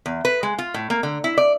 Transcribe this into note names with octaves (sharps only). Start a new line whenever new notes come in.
E2
B4
G#3
F4
A2
A#3
D3
E4
D5